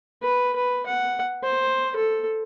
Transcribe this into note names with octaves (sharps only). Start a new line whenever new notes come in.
B4
B4
F#5
C5
A4